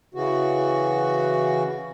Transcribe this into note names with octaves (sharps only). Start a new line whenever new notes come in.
C#3 E3 F#4